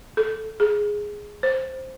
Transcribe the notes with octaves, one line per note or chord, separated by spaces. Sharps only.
A4
G#4
C5